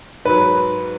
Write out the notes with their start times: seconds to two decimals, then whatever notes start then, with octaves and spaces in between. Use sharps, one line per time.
0.25 G#2 F#3 B4